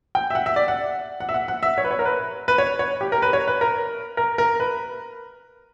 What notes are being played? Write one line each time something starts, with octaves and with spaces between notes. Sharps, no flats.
G5
E5
F#5
E5
D5
F#5
F#5
E5
F#5
F#5
E5
C#5
B4
C#5
A#4
B4
B4
C#5
C#5
G4
A#4
B4
C#5
B4
A#4
A#4
A#4
B4